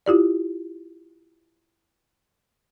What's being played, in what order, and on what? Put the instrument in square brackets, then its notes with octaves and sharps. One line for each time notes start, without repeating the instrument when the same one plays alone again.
[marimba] E4 F4 G4 D5